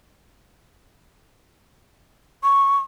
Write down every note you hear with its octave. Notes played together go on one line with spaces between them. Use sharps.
C#6